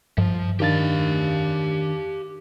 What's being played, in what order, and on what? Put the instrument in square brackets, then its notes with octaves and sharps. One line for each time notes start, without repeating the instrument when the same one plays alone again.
[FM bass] G2 [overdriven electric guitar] F3
[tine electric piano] D#3 D4 A6 [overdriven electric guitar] G4 F5